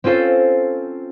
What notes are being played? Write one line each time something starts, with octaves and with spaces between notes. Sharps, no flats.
C4 C#4 F4 A4 C5